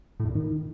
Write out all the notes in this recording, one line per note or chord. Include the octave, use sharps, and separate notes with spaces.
A2
E2
A#2
D#3